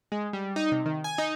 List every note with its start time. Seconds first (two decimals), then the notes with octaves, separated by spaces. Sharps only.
0.12 G#3
0.33 G3
0.56 D#4
0.72 C3
0.86 D#3
1.04 G#5
1.18 D#4